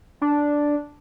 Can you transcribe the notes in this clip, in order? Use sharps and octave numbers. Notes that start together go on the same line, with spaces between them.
D4